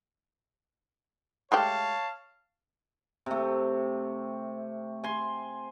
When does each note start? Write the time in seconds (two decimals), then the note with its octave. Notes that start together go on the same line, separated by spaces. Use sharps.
1.52 G#3 A3 G4 C#5 F5 A5
3.26 C3 A3
5.04 G#5 C6